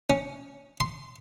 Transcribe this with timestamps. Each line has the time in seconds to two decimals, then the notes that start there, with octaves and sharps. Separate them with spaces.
0.10 C#4
0.80 C6